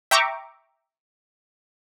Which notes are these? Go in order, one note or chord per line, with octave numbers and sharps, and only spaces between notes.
E5 G5 A#5 C#6 D6